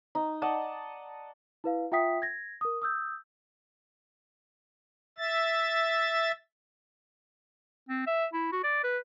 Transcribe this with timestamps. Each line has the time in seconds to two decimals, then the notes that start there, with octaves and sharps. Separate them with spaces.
0.15 D#4
0.42 D5 D#5 F#5 A5
1.64 E4 B4 F5
1.92 F4 E5 F#5 G5 D#6 B6
2.22 G#6 A#6
2.61 A#4 D#6
2.82 D#6 E6 G6
5.18 E5 A6
7.89 C4
8.07 E5
8.33 E4
8.52 F#4
8.64 D5
8.84 B4